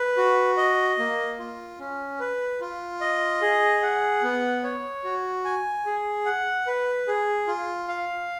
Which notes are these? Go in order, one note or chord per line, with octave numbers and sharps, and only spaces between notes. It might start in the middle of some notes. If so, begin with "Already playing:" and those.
Already playing: B4
F#4
D#5
A#3
F4
C#4
B4
F4
D#5
G#4
F#5
B3
C#5
F#4
G#5
G#4
F#5
B4
G#4
F4
F5